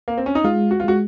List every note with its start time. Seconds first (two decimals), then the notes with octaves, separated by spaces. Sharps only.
0.08 A#3
0.17 C4
0.26 C#4
0.35 D#4
0.44 G#3 F4
0.71 F#4
0.80 F4
0.84 G#3 F#4